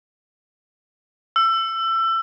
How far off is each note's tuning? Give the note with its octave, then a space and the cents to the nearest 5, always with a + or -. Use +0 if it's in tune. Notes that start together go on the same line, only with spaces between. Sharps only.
E6 +25